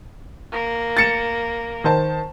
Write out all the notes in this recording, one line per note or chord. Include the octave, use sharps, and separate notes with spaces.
A#3
A6 C#7 E7
D#3 C5 A5